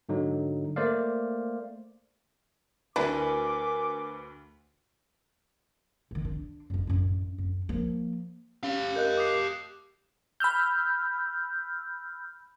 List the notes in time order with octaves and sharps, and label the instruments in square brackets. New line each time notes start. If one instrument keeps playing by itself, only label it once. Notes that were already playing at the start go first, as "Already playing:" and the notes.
[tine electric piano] G#2 D3 F#3 D#4
A3 A#3 C5 D5 F5
[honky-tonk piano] D2 B4 [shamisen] D4 E4 [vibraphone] A#4 G#5 [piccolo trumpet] D6
[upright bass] D#3 E3
D4
A1 F#2
A1 F#2
F#2
F3 A#3
[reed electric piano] C#4 [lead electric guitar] G4 F5
[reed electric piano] A#4 D#5 [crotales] F#6 G6
[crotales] D6 D#6 C7
[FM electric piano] B5 E6 F6 G6